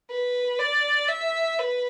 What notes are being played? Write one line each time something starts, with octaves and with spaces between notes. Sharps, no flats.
B4
D5
E5
B4